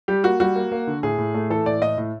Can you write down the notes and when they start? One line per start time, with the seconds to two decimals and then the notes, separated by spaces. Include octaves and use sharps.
0.08 G3 G4
0.24 A#3 F#4
0.40 G3 F#4
0.56 A#3
0.72 A#3
0.87 D3
1.03 A2 G#4
1.18 A2
1.34 A3
1.50 E3 A4
1.66 A2 D5
1.82 A2 D#5
1.98 A2